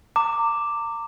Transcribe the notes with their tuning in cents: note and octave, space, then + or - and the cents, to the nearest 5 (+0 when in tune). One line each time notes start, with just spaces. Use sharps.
A#5 -35 D6 +0